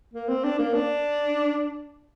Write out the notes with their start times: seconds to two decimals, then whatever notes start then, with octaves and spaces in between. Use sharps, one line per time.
0.14 A#3
0.28 C4
0.44 D4
0.59 A#3
0.74 D4